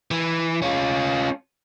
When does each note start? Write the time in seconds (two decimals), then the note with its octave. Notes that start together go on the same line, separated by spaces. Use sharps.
0.11 E3
0.62 C#4 F4